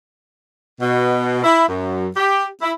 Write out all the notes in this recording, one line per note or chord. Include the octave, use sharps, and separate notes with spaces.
B2
E4
F#2
G4
E4